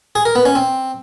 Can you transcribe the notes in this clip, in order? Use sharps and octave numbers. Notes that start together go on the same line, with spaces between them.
G#4
A#4
B3
C#4
C4